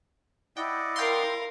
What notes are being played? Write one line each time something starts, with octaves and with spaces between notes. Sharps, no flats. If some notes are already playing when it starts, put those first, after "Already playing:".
E4 D5 D#5 F#5 G5
A#4 F5 G5 C6